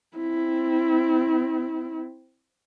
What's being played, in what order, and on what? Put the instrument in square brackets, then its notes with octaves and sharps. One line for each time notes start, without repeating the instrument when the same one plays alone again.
[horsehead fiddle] C4 E4